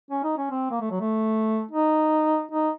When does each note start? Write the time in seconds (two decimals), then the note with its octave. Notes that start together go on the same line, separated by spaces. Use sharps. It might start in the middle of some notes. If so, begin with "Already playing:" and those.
0.11 C#4
0.23 D#4
0.37 C#4
0.51 C4
0.71 A#3
0.80 A3
0.91 F#3
1.00 A3
1.71 D#4
2.51 D#4